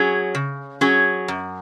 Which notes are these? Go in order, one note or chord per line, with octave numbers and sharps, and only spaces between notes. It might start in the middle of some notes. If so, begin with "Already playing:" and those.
Already playing: F#3 C#4 G#4
C#3
F#3 C#4 G#4
F#2